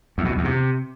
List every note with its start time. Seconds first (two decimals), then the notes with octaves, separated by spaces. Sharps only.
0.18 E2
0.25 B2
0.31 F2
0.38 E2
0.45 C3